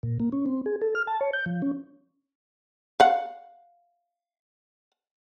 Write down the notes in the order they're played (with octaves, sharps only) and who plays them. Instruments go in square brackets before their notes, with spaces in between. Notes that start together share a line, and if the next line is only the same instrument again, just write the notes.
[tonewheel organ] A#2
A#3
C#4
C4
G#4
A4
F6
A5
C#5
G6
F3
C#4
[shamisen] F5 F#5